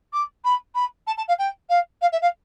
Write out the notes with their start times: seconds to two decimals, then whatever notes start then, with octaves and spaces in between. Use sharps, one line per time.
0.12 D6
0.44 B5
0.74 B5
1.06 A5
1.17 A5
1.27 F5
1.38 G5
1.69 F5
2.01 F5
2.12 E5
2.21 F5